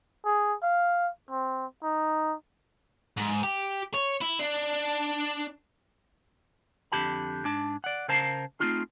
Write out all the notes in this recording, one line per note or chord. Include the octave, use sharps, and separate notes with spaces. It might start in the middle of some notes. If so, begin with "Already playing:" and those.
G#4
F5
C4
D#4
G#2
G4
C#5
E4
D4
F2 G#2 D3 G4 A5 B5
G#2 D4 A5
D5 F#5
C#3 A#4 C5 F5 A5 A#5
A3 A#3 C4 D#4 F4 G#4